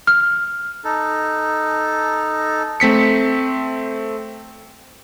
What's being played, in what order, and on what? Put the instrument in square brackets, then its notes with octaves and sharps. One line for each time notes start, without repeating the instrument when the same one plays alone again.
[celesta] F6
[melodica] D#4 A4
[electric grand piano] A3 C4 B6 C#7